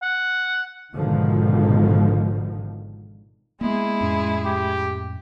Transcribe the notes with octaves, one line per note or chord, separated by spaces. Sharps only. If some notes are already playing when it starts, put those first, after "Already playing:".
F#5
G#1 G#2 B2 D3 D#3 F3
G#3 A#3 B3 E4 G#4
F2 A2 C#4
G4